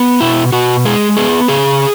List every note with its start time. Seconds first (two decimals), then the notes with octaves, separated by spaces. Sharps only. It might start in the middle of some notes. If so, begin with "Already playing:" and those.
Already playing: B3
0.21 B2 E4
0.52 B2 F#4
0.85 G#3 G#4
1.17 B3 G#4
1.48 C#3 G#4